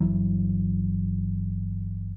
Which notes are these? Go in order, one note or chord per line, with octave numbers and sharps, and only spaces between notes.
G1 D2 E3 F#3